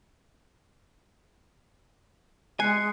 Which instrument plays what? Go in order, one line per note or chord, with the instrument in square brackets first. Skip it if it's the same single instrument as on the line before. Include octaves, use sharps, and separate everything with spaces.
[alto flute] G#3 [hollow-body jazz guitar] G#5 [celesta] F#6 C7 C#7